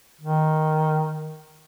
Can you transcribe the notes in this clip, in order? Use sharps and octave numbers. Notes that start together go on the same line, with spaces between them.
D#3